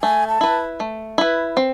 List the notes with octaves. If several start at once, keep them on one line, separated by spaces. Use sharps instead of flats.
A3 G#5
A5
E4 B4
A3
E4 B4
C4